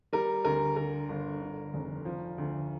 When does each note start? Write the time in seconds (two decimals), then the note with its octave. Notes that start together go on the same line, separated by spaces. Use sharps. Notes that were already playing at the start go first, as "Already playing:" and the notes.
0.13 G3 A#4
0.45 D2 A#4
0.76 D3 A#4
1.09 G1
1.41 D3
1.74 F1
2.05 F3
2.38 D2